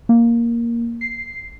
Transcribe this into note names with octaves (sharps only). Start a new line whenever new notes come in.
A#3
C7